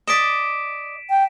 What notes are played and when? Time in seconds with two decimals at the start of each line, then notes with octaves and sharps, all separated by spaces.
0.07 D5 D#5 B6 D7 E7
1.10 G5